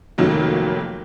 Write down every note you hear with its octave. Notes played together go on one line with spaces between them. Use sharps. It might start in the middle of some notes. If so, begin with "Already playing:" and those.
F1 F2 D#3 F#3 A#3